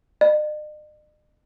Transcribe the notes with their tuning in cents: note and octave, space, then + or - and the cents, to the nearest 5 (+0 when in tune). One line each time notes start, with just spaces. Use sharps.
D#5 -45